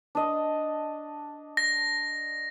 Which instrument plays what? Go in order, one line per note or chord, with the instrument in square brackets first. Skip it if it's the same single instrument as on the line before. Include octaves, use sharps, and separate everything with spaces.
[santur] D4 D#5
[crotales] A#6